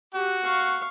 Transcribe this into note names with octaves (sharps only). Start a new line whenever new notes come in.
F#4 G4
F5 C#6